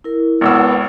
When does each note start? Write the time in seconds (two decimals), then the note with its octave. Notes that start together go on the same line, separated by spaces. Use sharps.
0.04 E4 A#4
0.41 G#1 C#2 B3 E6